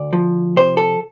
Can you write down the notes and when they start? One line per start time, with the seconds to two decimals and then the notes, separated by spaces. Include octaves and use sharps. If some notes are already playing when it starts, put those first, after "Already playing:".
Already playing: D2 D5
0.13 F3
0.57 C3 C5
0.77 A4